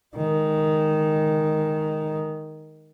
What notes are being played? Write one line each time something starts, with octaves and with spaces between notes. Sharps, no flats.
D#3 G#3